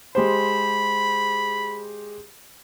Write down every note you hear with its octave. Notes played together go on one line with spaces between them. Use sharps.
G#3 G4 C5 B5